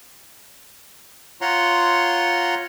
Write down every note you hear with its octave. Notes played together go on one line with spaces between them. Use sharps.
F4 C#5 F#5 A#5 C6